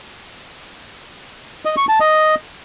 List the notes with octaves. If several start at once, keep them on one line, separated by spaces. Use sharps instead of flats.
D#5
C#6
A5
D#5